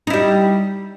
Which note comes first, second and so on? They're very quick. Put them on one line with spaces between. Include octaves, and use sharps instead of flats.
D#4 E4 G3